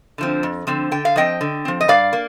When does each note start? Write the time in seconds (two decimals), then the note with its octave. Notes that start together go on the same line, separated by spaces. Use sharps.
0.18 D3 F3 C4
0.43 F2
0.67 D3 F3 C4
0.91 D3 G5
1.05 F5
1.16 F3 C4 D#5 G5
1.41 D3
1.65 F3 C4
1.81 D#5
1.88 G2 D5 F5
2.13 A#3